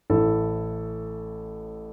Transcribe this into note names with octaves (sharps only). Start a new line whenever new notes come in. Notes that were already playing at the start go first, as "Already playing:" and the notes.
A1 A2 A3 E4 A4